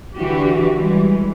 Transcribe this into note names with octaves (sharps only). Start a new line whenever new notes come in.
D3 E3 F#4 G4
E3 G3 G#3